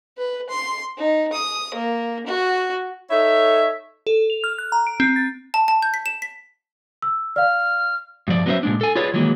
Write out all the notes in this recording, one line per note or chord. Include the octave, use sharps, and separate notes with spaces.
B4
C6
D#4
D#6
A#3
F#4
D#4 A4 C#5 E5
A4
F7
F6
F#6
A#5
D7
C4
A6
A5
A5
G6
B6
E7
B6
E6
D5 F5 F6
G2 F3 D5
F#3 B3 C#4 D4 C5 E5
A#2 G#3 D4
A4 G#5
F4 G#4 B4 C#5 D5
D#3 E3 F#3 G#3 A#3